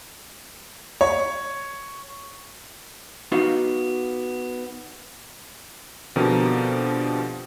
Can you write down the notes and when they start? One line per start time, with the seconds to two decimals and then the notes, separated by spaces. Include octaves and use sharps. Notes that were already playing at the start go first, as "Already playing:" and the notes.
1.01 C#5
3.32 B3 D#4 F#4 F5
6.16 B2 D3 F3 C4 G4 A#4